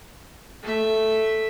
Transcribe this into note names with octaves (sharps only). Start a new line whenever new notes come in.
A3 E5